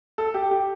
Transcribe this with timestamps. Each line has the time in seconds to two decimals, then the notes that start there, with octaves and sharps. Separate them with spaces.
0.18 A4
0.34 G4
0.51 G4